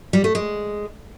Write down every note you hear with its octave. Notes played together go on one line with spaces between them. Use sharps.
G3
A3
G#3